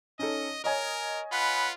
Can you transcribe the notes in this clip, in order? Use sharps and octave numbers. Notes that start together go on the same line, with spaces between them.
C#4 D#4 A4 D#5
A#4 C#5 D#5 G#5
F4 B4 F#5 B5